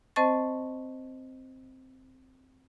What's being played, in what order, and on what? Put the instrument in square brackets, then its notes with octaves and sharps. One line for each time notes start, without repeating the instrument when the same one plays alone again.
[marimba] C4 C5 D#5 A5 C#6 A6